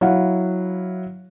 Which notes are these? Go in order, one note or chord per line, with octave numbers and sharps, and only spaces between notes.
F#3 E4 F5 F#5